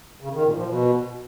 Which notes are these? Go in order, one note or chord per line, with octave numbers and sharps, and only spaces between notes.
C#3
D#3
A#2
F3
B2